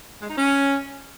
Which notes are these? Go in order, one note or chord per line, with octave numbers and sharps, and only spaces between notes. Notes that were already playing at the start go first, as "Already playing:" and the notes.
G#3
D#4
C#4